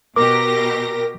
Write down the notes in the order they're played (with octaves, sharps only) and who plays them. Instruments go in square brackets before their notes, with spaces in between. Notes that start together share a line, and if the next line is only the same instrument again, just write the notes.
[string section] B2 G4 A#6 [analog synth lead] A#4 [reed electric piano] D6